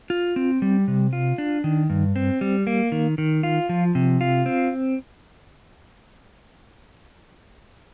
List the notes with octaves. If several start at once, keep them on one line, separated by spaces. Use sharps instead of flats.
F4
C4
G3
C3
F4
D4
D#3
G2
C4
G3
A#3
D#3
D#3
F4
F3
C3
F4
C4